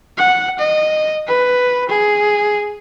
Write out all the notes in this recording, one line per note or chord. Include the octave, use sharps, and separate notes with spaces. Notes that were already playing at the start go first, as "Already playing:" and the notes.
F#5
D#5
B4
G#4